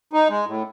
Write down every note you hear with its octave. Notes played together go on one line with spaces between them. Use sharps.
D#4
G#3
A2